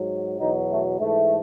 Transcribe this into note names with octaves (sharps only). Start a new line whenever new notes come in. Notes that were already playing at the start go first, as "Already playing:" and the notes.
Already playing: G#2 F#3
E2 B2 F#3 D#4
A3
G#2 E3 A3